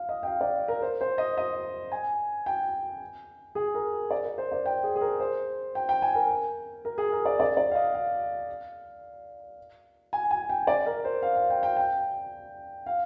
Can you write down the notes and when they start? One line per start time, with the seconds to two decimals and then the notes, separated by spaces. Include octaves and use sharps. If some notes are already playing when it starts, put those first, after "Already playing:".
Already playing: F5
0.09 D#5
0.23 G5
0.27 F5
0.41 D5
0.68 A#4
0.82 C5
1.01 C5
1.18 D#5
1.37 D#5
1.92 G#5
2.46 G5
3.55 G#4
3.75 A#4
4.11 D5
4.24 A#4
4.38 C5
4.52 D5
4.66 G5
4.84 G#4
4.96 G#4
5.01 A#4
5.20 C5
5.75 G5
5.89 G5
6.02 G#5
6.15 A#4
6.85 A#4
6.98 G#4
7.12 A#4
7.25 D5
7.40 D5
7.57 D5
7.71 F5
7.75 D#5
7.94 F5
10.13 G#5
10.31 G#5
10.49 G5
10.67 D5
10.86 A#4
11.04 C5
11.22 F5
11.36 F5
11.50 G5
11.63 G5
11.77 G5
12.86 F5